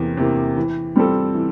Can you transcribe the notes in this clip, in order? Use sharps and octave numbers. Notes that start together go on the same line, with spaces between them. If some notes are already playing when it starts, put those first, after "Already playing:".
Already playing: E2 C3 E3 A#3
C3 E3 A#3
E3
G3 C4 F4 A4
E3